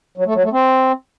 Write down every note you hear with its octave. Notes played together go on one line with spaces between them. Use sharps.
F#3
A3
F#3
A3
C4